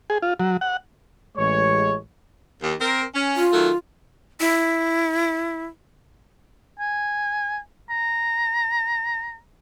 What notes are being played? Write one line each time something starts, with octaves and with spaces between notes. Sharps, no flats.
G#4
F4
F#3
F#5
A1 G#3 C#5
D#2
C4 A#4
C#4
F4
D#3 F#3 A3
E4
G#5
A#5